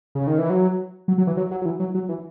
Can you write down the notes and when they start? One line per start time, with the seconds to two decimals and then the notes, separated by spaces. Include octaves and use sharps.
0.15 C#3
0.27 D#3
0.38 E3
0.50 F#3
1.08 F#3
1.18 F#3
1.27 E3
1.37 F#3
1.51 F#3
1.62 F#3
1.65 E3
1.80 F#3
1.95 F#3
2.09 E3